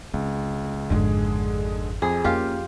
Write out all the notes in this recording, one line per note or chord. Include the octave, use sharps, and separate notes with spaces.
C#2 C4
G#1 F2 D3 G#3 G#4
F2 G#4
F2 A#3 C#4 F4 G4